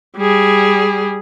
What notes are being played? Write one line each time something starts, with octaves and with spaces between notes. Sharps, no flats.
G3 G#4